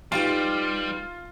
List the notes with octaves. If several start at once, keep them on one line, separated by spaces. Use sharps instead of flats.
G3 D#4 F4 G4 B4